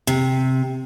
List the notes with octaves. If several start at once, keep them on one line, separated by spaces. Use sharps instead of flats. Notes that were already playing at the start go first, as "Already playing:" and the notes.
C3